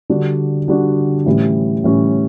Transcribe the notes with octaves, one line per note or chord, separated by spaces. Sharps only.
D3 G3 D4 F#4
D3 G3 D4 F#4
A2 E3 G3 C#4
A2 E3 G3 C#4